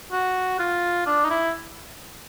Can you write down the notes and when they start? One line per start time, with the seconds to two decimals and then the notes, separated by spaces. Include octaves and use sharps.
0.12 F#4
0.59 F4
1.06 D4
1.24 D#4
1.30 E4